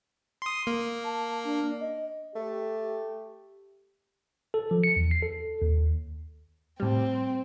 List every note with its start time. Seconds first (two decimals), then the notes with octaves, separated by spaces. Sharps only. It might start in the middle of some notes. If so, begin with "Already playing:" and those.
0.42 C6 D#6
0.67 A#3
1.04 A5
1.44 D4
1.80 D#5
2.35 A3 G4
4.54 A4
4.71 F3
4.84 C#7
4.96 E2
5.11 C7
5.22 A4
5.62 D#2
6.80 A2 G3 C4